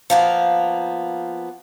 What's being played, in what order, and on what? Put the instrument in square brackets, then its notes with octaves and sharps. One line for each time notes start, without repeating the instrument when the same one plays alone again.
[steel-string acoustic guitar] F3 A#3 B3